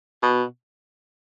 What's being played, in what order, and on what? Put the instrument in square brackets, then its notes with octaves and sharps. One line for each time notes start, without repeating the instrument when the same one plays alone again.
[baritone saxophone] B2